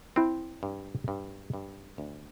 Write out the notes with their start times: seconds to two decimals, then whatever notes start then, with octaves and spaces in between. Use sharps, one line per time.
0.16 C4 E4
0.63 G2
1.08 G2
1.54 G2
1.98 D2